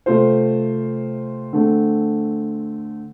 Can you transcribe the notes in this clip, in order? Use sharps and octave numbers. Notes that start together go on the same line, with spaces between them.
C3 A3 F4 C5
D3 A3 C4